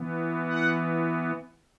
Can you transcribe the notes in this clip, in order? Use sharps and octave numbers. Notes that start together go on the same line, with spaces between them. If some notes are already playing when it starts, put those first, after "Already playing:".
Already playing: E3 B3
F#5